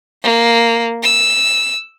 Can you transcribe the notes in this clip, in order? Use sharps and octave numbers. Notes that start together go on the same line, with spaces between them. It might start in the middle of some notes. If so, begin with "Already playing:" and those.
A#3
E6